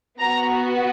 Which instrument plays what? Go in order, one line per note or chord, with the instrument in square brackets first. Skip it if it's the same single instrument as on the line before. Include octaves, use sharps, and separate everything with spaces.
[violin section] B3 F#4 A#5